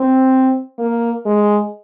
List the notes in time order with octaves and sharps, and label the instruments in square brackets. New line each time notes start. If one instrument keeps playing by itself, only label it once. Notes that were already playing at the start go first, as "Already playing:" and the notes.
Already playing: [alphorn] C4
A#3
G#3